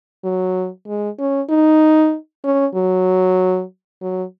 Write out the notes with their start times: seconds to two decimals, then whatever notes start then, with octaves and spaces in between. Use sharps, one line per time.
0.24 F#3
0.87 G#3
1.19 C#4
1.49 D#4
2.44 C#4
2.75 F#3
4.01 F#3